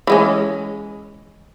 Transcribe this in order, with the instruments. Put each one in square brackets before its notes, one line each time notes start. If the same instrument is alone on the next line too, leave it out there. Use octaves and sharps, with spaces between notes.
[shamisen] E3 G#3 C#4